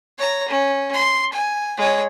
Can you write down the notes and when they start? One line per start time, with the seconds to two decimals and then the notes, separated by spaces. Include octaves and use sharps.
0.18 C#5 A#5
0.48 C#4
0.93 C6
1.33 G#5
1.78 G#3 C#5